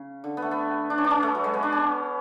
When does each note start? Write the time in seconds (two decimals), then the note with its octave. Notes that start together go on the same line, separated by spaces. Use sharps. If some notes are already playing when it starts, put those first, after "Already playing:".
Already playing: C#3
0.24 D3
0.37 B3
0.42 A3
0.51 B3
0.90 D4
0.98 C#4
1.04 D4
1.10 C#4
1.23 A3
1.35 F#3
1.44 G#3
1.54 B3
1.63 D4
1.72 C#4